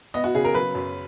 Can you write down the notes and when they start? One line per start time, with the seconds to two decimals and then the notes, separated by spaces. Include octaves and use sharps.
0.14 B3 D#5
0.24 F#4
0.34 C#3 G#4
0.45 A#4
0.55 F#3 B4
0.75 F#2